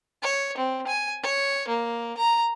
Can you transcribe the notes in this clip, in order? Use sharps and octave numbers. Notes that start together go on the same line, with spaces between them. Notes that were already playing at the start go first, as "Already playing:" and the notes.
C#5
C4
G#5
C#5
A#3
A#5